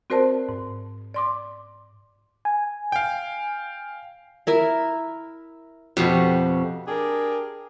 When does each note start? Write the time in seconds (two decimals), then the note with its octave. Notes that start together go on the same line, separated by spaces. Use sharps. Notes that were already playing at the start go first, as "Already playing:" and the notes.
0.10 C4 F#4 A#4 C5 D5 A5
0.49 G#2
1.14 D5 C6 D6
2.45 G#5
2.92 F5 G5
4.47 E4 A#4 E5
5.97 F2 B2 F#4 G4
6.87 D4 G4 G#4 A#4